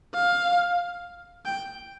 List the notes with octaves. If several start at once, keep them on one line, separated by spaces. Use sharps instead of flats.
F5
G5